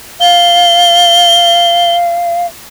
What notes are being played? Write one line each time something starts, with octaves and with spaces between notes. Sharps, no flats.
F5 G7